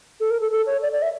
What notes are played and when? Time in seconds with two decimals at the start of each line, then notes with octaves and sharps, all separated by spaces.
0.20 A4
0.30 A#4
0.41 A4
0.51 A4
0.66 C#5
0.82 D5
0.92 D5
1.02 E5